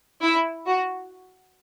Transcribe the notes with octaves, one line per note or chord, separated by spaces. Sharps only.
E4
F#4